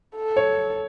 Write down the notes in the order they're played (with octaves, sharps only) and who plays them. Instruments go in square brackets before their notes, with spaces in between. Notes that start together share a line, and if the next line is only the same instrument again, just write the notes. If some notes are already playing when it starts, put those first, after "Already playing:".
[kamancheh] A4
[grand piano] C#5